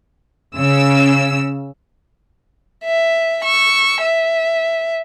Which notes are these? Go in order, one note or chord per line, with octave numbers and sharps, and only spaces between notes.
C#3 E6
E5
C#6 E6
E5